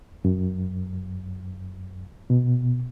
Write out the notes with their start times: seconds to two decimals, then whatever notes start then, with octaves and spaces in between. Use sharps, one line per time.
0.25 F#2
2.30 B2